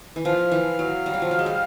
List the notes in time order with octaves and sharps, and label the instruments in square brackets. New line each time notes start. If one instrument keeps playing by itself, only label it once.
[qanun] E3
[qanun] F3 [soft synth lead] F5
[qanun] E3
F#3
G3
F#3
F3
F#3
G#3
G3